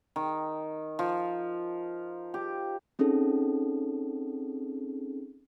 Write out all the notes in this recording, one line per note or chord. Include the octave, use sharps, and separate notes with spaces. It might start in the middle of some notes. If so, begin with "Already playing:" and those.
D#3
F3
G4
C4 C#4 D#4 G#4 A4